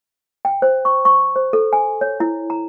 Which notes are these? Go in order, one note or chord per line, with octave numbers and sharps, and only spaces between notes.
G5
C5
C#6
C#6
C5
A4
G#5
C#5
E4
A#5